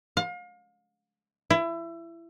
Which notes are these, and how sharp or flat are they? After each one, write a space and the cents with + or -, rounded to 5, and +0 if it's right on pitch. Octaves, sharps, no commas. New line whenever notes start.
F5 +35
E4 +25